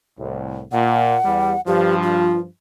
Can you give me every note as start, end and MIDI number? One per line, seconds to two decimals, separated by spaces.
0.19 0.63 36
0.19 0.63 45
0.72 1.16 46
0.72 1.61 78
1.24 1.54 40
1.24 1.54 55
1.67 2.46 43
1.67 2.46 53
1.67 1.95 67
2.03 2.40 65